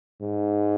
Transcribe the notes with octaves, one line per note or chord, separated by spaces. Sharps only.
G#2